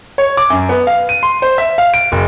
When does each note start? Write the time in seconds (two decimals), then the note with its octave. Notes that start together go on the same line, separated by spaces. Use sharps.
0.18 C#5
0.37 D6
0.50 F#2
0.69 B3
0.87 F5
1.09 D#7
1.23 C6
1.42 C5
1.58 E5
1.78 F5
1.94 D7
2.12 F#1